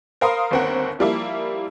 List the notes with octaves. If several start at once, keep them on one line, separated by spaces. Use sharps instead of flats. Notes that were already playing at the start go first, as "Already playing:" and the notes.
A#4 C5 F5 B5 C6 D#6
G1 D#2 C4 A#4 F#5
F3 G3 A#3 E4